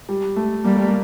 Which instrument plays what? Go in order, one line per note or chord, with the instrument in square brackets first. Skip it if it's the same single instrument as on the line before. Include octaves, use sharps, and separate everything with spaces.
[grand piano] G3
A3
[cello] G3 [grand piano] A#3
[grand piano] A3
A#3